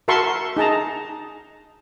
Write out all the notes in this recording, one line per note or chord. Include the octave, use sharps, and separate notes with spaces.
F#4 A#4 E5 A5 C6 C#6
D#4 G#4 A5 A#5